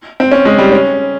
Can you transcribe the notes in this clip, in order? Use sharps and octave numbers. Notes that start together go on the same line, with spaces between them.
C4
C#4
G#3
G3
C#4